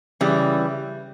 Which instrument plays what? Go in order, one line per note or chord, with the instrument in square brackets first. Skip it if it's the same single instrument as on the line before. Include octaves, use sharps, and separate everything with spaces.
[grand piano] C#3 [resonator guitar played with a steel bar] E3 G3